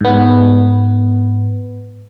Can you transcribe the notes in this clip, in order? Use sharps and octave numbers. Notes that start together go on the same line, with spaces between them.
G#2 B3